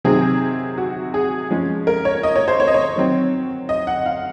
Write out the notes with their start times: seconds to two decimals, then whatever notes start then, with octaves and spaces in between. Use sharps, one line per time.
0.05 C3 D#3 F#3 C4 G#4
0.78 F#4
1.14 G#4
1.50 F3 G#3 C#4
1.87 A#4
2.05 C#5
2.23 D#5
2.36 C#5
2.48 C5
2.60 C#5
2.67 D#5
2.74 C#5
2.96 D#3 F#3 C4
3.69 D#5
3.87 F#5
4.06 F5